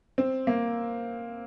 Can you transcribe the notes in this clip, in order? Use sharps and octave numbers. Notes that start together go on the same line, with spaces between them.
C4
A#3